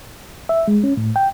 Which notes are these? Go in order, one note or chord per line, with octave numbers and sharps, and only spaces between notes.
E5
G#3
C#4
A2
G5